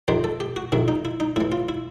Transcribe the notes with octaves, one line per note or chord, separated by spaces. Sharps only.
F2 C3 D#3 C5
A4
G4
F#4
F2 C3 D#3 E4
D#4
E4
D#4
A2 E3 E4
F4
E4